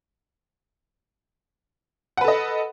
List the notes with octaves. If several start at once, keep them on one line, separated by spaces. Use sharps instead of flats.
A4 B4 D#5 F#5